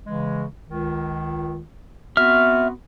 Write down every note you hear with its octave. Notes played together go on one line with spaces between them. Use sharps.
C#3 E3 G#3
C#2 D#3
B3 C4 F#4 E5 F6